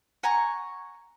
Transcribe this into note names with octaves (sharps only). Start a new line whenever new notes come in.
F#5 G#5 A#5 C#6